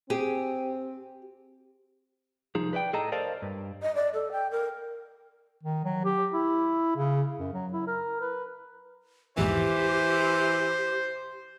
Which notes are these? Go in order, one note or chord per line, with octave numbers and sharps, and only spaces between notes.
C4 G4 G#4
C2 F3 D#4 G#4
B4 D5 D#5 G5
A2 G#4 A4 D#5 A5 A#5
A#4 C5 D5 D#5 F5 A5
G2
D#5
D5
A4
G5
A#4
D#3
F#3
G4
E4
C#3
F#2
F#3
E4
A#4
B4
A#1 E2 G#2 E3 G4 C5